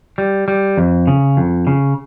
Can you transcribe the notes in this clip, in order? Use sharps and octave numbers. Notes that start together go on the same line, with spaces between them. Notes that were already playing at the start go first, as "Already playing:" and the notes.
G3
G3
F2
C#3
F2
C#3